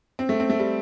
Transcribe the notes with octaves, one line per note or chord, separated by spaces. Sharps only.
C4
A3
C4
A3
G3